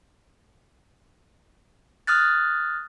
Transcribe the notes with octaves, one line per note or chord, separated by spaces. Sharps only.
D#6 F6 F#6 A6